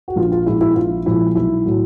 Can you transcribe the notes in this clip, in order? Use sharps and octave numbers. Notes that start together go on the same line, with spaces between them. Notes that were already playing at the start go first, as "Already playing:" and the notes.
F#4
A#1 F4
F4
A#2 F3 G#3 E4
E4
A#1 F4
A#2 F3 G#3 E4
B1 E4
A2 F#3